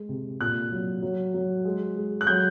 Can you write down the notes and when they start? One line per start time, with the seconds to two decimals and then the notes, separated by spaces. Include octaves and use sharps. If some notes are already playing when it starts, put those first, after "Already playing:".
Already playing: G#3
0.09 C3
0.40 A#2 F#6
0.71 F#3
1.02 F#3
1.34 F#3
1.65 G#3
1.96 G#3
2.21 F#6
2.27 F#3 G6